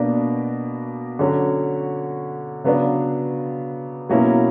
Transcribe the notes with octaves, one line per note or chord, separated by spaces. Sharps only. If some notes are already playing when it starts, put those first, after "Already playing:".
Already playing: B2 A#3 D4
D3 F#3 C#4
C#3 F#3 B3 D4
B2 F#3 A#3 C#4 E4